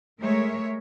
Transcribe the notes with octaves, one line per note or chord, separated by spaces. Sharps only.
G#3 A3 A#4 C#5 E5